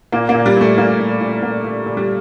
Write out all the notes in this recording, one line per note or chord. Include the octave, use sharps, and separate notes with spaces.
A#2 A#3
A#3
A#2
G3
A#2 A3
A#2 A#3
A#2
A#2
A#2 A#3
A#2
A#2
G3